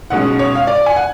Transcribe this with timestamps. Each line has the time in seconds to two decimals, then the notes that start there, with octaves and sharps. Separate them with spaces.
0.10 B1 B2 G#3 C#4 F#5
0.39 C#5
0.55 F5
0.67 D5
0.86 G#5
0.96 F#5